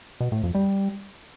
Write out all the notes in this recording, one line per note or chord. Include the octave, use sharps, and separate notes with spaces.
B2
A2
F2
G3